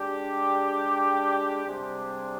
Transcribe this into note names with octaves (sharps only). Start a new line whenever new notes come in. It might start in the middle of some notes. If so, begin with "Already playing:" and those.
Already playing: G#3 D4 G4
C3 G3 D4 G#4 C5